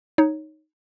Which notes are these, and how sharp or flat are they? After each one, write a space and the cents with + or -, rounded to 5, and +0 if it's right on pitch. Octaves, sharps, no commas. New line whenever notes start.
D#4 +0 C#5 +0